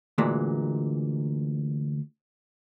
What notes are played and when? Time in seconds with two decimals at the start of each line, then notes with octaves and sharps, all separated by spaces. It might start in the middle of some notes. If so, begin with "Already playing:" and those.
0.18 D2 A#2 E3 G#3